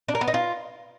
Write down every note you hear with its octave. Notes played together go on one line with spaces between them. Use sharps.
D4
A#4
B3
D#4
F4